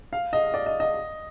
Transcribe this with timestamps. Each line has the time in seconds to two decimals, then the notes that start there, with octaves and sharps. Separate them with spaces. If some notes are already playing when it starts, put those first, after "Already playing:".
0.13 F5
0.33 D#5
0.54 D5
0.66 D#5
0.80 D#5